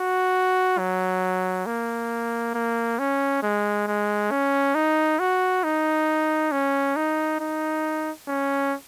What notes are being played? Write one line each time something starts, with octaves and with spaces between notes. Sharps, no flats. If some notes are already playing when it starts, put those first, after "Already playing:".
Already playing: F#4
F#3
A#3
A#3
C#4
G#3
G#3
C#4
D#4
F#4
D#4
C#4
D#4
D#4
C#4